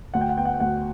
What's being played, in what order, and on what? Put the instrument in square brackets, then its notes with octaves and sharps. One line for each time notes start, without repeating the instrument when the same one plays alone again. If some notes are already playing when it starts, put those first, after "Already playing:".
[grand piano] D2 F#5
G5
F#5
B3 G5
F#5
G5
D2 F#4 F#5